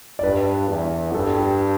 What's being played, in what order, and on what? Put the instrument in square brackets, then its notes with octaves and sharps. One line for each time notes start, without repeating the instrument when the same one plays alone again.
[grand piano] D5
[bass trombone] G2 [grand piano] B4
[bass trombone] E2
[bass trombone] G2 [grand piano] A4
[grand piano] G4